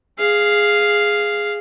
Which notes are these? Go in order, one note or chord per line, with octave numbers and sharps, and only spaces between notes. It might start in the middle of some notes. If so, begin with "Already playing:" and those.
G#4 F5